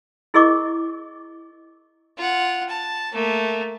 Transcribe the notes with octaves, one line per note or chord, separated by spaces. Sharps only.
E4 G#4 A#4 D#5 C#6 D6
F4 F#5
A5
A3 A#3